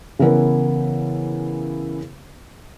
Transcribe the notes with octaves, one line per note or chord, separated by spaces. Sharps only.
C#3 E3 B3 E4 A#4 B4